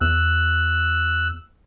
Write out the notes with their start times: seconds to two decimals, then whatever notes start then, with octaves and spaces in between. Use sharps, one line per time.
0.01 E2 E6 F#6